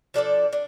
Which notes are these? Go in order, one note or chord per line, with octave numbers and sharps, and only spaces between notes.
F3 D4 A4 D5
D4